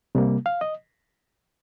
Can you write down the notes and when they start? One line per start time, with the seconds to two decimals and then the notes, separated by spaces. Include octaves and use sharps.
0.15 C3 G3 A#3
0.46 F5
0.61 D#5